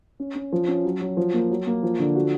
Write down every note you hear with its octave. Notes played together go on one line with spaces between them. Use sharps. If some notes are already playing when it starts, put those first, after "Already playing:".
C#4
C#4
F3
C#4
F#3
F#3
F3
A#3
F#3
A#3
F3
D3
F#4